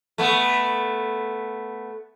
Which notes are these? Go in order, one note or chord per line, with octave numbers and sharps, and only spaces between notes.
A3 B3